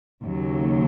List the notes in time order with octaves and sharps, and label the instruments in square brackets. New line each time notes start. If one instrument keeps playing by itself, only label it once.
[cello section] D#2 C#3 F#3